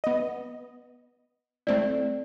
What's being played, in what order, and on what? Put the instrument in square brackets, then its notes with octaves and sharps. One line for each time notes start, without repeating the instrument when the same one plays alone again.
[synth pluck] B3 D#5
[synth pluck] A3 C4 E4 [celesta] D5